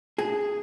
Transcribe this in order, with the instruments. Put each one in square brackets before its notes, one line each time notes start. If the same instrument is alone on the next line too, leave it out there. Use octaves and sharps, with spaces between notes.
[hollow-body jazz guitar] G#4